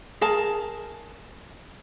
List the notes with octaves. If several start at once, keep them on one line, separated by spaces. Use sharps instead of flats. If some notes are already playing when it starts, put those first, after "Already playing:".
G#4 A#4 A5